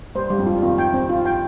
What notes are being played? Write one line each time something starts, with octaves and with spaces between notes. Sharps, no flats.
G2 C5
G3
F2 G#2
F4
C3 D#3 F4
G5
C4
F4
G5